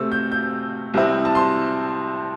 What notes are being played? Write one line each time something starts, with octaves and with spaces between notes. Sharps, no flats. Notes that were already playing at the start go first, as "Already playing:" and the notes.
Already playing: C3 A3 C4 E6
G6
G6
C2 C3 G3 C4 E4
A5
C6